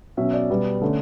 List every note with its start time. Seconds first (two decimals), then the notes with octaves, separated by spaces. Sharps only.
0.17 B2 F#3 C#4 E5
0.33 D5
0.50 B2 G3 B3
0.81 D3 A3 C#4